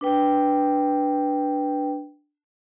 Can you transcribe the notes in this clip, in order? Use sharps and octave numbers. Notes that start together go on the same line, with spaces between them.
D4 B4 G5